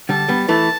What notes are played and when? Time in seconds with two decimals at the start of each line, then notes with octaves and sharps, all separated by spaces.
0.09 D3 G3 A5
0.29 G3 B3
0.48 E3 A3 A5